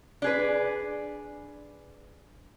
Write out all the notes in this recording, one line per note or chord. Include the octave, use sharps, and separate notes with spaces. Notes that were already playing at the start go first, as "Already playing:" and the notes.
D4 G#4 B4